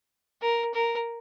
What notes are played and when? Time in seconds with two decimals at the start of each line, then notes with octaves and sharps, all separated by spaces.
0.41 A#4
0.74 A#4